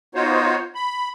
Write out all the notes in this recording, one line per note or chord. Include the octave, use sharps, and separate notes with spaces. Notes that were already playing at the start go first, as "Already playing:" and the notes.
B3 D#4 F4 F#4 C5 C#5
B5